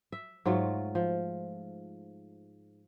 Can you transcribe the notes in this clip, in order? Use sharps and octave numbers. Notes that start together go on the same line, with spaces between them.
E5
G#2 F#3 A3 F4
F3